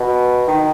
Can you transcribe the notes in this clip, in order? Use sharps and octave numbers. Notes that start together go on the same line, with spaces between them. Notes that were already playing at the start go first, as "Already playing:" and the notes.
Already playing: B2
D#3